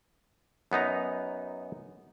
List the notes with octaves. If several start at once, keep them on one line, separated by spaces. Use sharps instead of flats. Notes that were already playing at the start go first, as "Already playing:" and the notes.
F#2 B3 D#4 A#5